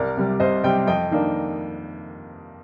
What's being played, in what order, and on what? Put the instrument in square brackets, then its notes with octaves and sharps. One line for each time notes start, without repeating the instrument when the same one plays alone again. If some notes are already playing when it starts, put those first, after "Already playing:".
Already playing: [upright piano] C2 A#4 D5
C3 G3
C2 C5 D#5
C3 G3 D#5 G5
F2 D#5 G5
D#3 A#3 D4